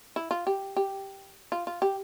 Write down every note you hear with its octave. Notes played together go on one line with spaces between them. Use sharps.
E4
F4
G4
G4
F4
F4
G4